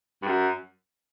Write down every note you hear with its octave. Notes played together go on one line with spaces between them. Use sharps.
G2
F#2